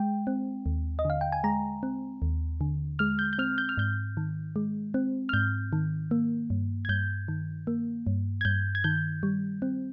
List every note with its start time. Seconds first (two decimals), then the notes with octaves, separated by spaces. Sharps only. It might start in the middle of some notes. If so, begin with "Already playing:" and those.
Already playing: G#3 G5
0.27 C4
0.66 D#2
0.99 D#5
1.05 D3 F5
1.21 G5
1.32 G#5
1.44 G#3 A#5
1.83 C4
2.22 D#2
2.61 D3
2.99 G#3 F6
3.19 G6
3.33 G6
3.38 C4 F6
3.58 G6
3.69 F6
3.77 G#2 G6
4.17 D#3
4.56 G#3
4.94 C4
5.29 F6
5.33 G#2 G6
5.73 D#3
6.11 A#3
6.50 G2
6.85 G#6
6.89 G2 G6
7.28 D#3
7.67 A#3
8.07 G2
8.41 G#6
8.45 G2 G6
8.75 G#6
8.84 D#3 G6
9.23 G3
9.62 C4